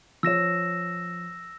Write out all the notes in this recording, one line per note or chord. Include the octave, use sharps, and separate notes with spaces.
F3 C#5 E6 A#6 E7